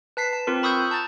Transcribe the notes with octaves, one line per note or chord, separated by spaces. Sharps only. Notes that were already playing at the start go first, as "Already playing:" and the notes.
B4 A5 B6 C7
A5
C4 F4 A#4
B5 C#6 D#6 E6 F#6 G6
A5 A#5 A6